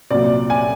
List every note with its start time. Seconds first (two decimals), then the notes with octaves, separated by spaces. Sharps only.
0.11 C2 A#2 F#3 D5
0.50 G#5